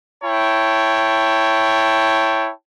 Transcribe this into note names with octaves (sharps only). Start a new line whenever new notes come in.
E4 C#5 G5 A5